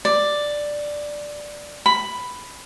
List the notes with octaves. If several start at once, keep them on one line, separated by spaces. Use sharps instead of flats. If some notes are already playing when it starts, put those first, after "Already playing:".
D5
B5